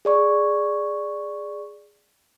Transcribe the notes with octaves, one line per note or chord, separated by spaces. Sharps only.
G#4 D5 C#6